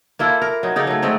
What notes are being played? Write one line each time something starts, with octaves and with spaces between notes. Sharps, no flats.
A#3 E4 F4 A4
A#4
F#3 D#4
C#3 D#4 A4 D5
F#3 A3
D3 G#3 A3 C4